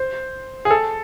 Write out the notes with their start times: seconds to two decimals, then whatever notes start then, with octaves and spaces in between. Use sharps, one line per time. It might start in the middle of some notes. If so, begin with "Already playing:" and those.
Already playing: C5
0.65 G#4
0.70 A4